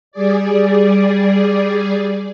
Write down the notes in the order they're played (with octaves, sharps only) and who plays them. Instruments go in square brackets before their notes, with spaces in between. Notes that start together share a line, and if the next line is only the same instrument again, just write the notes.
[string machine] G3 G#4 D5